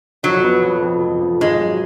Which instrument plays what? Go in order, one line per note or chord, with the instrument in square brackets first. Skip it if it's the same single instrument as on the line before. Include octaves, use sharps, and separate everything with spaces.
[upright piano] F2 [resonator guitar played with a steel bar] F#3
[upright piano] B3
F2
F2
F2
F2
[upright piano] G#1 [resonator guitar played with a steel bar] G#3
[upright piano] F#3